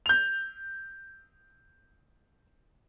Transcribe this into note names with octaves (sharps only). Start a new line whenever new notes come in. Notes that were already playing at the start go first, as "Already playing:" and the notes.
G6 F7